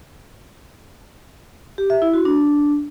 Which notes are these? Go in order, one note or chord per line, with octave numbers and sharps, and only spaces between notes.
G4
E5
E4
F#4
D4